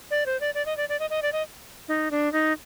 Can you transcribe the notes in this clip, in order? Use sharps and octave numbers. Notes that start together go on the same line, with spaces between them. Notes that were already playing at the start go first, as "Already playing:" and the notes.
D5
C5
D5
D5
D#5
D5
D5
D#5
D#5
D5
D#5
D#4
D4
D#4